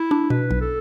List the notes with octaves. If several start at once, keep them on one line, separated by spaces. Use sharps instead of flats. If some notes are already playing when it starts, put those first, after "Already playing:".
Already playing: E4
D4
B2 B4
B1
A4